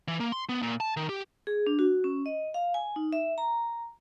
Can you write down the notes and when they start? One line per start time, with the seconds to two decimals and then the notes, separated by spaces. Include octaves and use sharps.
0.08 E3
0.20 A#3
0.32 C6
0.49 B3
0.62 A#2
0.80 A5
0.97 D#3
1.09 G4
1.47 G#4
1.67 D4
1.79 F#4
2.04 C#4
2.26 D#5
2.54 F5
2.74 G#5
2.96 D#4
3.13 E5
3.38 A#5